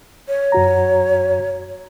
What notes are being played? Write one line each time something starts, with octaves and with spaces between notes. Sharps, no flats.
C#5
F#2 F#4 A#5